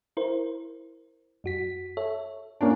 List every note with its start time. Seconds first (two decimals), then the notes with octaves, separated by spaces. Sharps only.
0.17 E4 A#4 C5
1.44 F#2 F#4 B6
1.97 A4 C#5 E5
2.61 A#3 C#4 D4